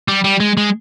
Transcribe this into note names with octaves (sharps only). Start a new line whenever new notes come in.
G3
G3
G#3
G#3